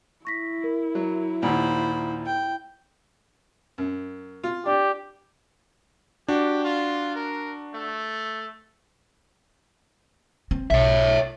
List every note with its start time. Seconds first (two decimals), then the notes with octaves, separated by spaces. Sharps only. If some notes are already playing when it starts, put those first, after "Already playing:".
0.25 E4 C#6 A#6 B6
0.64 A#4
0.95 F#3
1.43 D#2 A#2 C5 F#5 B5
2.26 G5
3.78 F#2
4.44 F4
4.66 D4 G4
6.28 D4 F#4 G4
6.64 F4
7.16 A#4
7.74 A3
10.51 C4
10.70 B1 C#5 E5